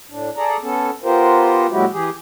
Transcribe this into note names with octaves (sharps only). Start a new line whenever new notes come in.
A2 D4
G#4 A4 D5 A#5
B3 C#4 A4
B3 F4 G4 A#4 C5
A#2 F#3 G#3 E4 F#4 G4
E3 G4 G#4